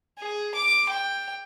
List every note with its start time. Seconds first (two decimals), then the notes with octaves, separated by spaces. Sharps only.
0.19 G#4
0.54 D6
0.89 G5